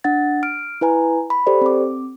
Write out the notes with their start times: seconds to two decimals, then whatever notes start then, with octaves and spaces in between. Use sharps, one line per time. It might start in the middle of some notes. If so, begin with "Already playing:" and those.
0.04 D4 F#5 A6
0.43 F6 D7
0.81 E4 B4 G#5 A#5
1.30 B5
1.47 G4 A4 C5 D5
1.61 C4 D6